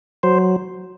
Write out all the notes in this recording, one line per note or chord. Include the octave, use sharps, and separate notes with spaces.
F#3 C5